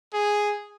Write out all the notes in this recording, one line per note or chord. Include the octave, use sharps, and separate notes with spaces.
G#4